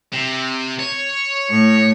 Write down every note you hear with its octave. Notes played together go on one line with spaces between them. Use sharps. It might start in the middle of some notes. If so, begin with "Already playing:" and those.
C3
C#5
A2